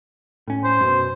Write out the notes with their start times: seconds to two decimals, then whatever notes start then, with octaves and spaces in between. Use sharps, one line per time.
0.47 A2 C#4
0.64 C5
0.81 F#2 B2